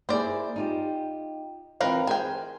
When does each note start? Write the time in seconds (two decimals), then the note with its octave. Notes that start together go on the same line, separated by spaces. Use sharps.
0.09 A#3 E4 G#4 C5 D5
0.56 D#4 F4 G4
1.80 E3 C4 F4 A#4 B4 F5
2.07 G#4 A#4 C5 G5 G#5